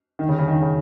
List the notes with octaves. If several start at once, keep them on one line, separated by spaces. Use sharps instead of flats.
D#3
C#3
C#3
D#3
C#3